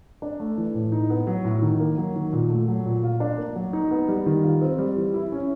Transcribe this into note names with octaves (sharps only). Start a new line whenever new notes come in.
D4
A3
E3
A2
D#4
B3
F#3
A2
D#3
A#3
F#3
D#3
A#2
A3
F#3
A#2
F4
D4
A#3
F#3
D#4
B3
G3
D#3
F4
C4
G3
E3
E4
C#4